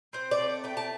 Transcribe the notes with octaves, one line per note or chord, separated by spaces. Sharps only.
C4 C5
D5
A3
A3 G5
A5